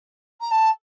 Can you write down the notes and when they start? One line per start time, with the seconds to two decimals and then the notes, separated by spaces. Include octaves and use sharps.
0.41 A#5
0.51 A5